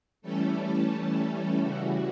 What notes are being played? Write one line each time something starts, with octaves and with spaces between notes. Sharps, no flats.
E3 G3 A3 C#4 A4
C#3 E3 G3 F#4